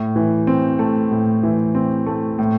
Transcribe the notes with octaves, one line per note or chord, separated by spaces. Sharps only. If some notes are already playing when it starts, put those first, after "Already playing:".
Already playing: A2
E3
C4
A3
A2
E3
C4
A3
A2